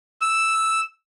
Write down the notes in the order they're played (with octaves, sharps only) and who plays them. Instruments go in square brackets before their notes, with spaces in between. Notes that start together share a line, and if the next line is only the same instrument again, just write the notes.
[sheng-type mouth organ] E6